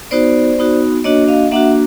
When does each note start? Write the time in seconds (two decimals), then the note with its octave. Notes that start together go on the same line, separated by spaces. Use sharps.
0.11 B3 D#4 F#4 C5 D5
0.59 B3 D#4 F#4
1.04 A#3 D4 F#4 C#5 D#5
1.28 D#5 F5
1.51 A#3 D4 F#4 E5 F#5